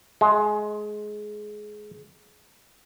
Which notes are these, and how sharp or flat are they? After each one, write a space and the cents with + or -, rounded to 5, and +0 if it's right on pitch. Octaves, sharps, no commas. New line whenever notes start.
G#3 +20